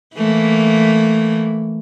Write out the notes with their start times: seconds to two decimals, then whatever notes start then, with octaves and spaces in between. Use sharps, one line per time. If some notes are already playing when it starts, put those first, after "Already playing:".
0.15 E3 A3 A#3